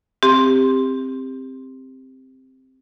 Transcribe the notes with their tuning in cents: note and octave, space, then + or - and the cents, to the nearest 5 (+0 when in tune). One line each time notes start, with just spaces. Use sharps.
C4 +0 G4 +20